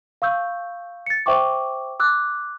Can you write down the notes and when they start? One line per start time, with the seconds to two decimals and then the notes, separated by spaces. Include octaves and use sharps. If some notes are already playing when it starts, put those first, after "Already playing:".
0.22 F5 C#6 E6 G6
1.06 A6 C#7
1.26 C5 E5 G5 C#6 D6
2.00 D6 E6 F#6